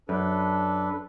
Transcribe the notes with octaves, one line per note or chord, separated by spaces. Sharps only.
F#2 D4 A4 B4